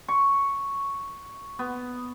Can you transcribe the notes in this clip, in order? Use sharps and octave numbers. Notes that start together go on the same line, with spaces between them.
C#6
B3